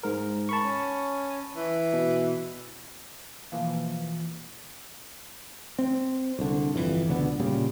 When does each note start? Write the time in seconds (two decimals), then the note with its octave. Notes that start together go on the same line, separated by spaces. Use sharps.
0.03 G#2 A#4
0.49 A5 B5 C#6
0.62 C#4
1.56 E3
1.93 B2
3.52 B2 E3 F3 A#3 F5
5.79 C4
6.39 C2 D3
6.74 G1 F2 C#3 E3
7.08 C#2 B2 D3 B3
7.40 A#2 C#3 G3